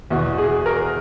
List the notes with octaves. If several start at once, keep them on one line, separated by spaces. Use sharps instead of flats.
E2 B2 F#4
G#4
A#4